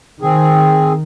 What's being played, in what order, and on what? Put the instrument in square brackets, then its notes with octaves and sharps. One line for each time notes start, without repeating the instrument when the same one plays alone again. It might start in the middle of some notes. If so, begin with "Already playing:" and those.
[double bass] D#3 [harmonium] C4 G#4